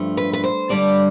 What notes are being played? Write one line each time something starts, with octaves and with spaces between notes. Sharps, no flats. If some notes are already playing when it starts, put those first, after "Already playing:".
Already playing: G2 F3 A3
B4
B4
C5
G2 D3 G3 D5